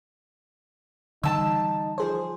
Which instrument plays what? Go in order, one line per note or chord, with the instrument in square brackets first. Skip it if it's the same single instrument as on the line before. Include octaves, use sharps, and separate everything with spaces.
[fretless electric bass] D3 E3 G3 [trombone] D#4 [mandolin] A5 E6
[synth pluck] F3 G#4 C5